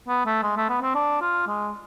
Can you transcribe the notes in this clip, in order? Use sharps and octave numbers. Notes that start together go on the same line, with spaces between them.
B3
A3
G#3
A3
B3
C4
D4
F4
G#3